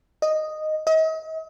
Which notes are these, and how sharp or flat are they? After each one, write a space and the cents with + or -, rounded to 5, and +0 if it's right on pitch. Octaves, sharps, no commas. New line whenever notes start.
D#5 -5
D#5 +40